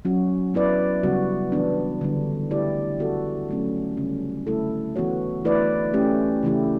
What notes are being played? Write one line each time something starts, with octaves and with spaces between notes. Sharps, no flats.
F#3 C#4 F#4
B3 E4 B4 D5
C#3 G3 B3 F#4
E3 B3 D4
D3 G3 D4
A3 E4 G4 D5
B3 F#4 A4
F#3 A3 C#4
C#3 G3 C#4
D3 A3 E4 A4
E3 B3 F#4 C#5
E3 A3 E4 B4 D5
A3 C#4 G4
C#3 E3 A3 E4 G4